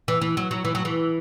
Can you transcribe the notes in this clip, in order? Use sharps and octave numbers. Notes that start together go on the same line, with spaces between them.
E3
E3
F#3
F#3
E3
F#3
E3